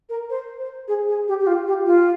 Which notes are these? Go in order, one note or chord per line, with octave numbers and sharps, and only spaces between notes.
A#4
C5
C5
G#4
G#4
G4
G4
F4
G4
F4